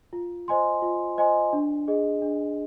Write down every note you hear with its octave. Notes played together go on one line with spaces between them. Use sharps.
F4
C5 D#5 G#5 C6
F4
C5 D#5 G#5 C6
D4
G#4 D#5
D4